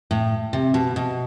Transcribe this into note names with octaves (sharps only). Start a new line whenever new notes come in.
A2
C3
B2
B2